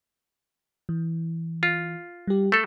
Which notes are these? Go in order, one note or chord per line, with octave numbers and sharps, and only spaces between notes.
E3
F4
G3 G4
A3 A4